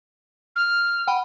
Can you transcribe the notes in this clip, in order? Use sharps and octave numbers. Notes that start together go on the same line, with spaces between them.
F6
F#5 G5 B5